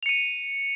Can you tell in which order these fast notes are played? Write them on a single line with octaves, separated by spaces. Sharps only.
F7 C#7 D#7